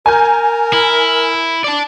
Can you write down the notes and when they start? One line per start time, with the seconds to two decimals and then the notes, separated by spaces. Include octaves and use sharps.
0.06 A#4 G#5 A#5 G6
0.73 E4
1.64 D5 A5